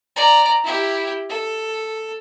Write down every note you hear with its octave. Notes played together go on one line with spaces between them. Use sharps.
D5 A#5
E4 G4
A4